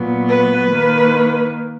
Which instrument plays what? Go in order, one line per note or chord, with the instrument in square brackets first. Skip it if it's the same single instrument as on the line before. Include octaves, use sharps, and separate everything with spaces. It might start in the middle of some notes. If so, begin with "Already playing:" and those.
Already playing: [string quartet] A#2 F#3 B3
B4
D#3 A#3